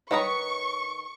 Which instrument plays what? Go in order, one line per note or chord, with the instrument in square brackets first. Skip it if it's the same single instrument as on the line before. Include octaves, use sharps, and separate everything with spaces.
[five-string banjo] D#3 B4 A#5 [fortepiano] C#5 D#5 D#6 [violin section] C#6